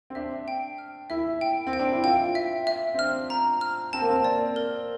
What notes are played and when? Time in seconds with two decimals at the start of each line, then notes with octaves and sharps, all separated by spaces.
0.10 C4
0.15 D4 E5
0.48 G5
0.78 F6
1.10 E4 E5
1.41 G5
1.67 C4
1.73 G5
1.79 D4
1.91 E4
2.04 F4 G5
2.35 E5
2.67 E5
2.94 C4
2.99 D4 F6
3.30 A#5
3.61 F6
3.93 C4 A5
4.01 A#3
4.09 C4
4.24 D5
4.56 A#4